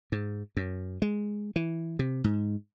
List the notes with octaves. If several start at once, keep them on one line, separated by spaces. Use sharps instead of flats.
G#2
F#2
G#3
E3
C3
G#2